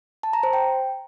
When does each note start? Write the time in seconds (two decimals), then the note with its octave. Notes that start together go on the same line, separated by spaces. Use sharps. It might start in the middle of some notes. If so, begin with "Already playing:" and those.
0.23 A5
0.33 A#5
0.43 C5
0.53 G5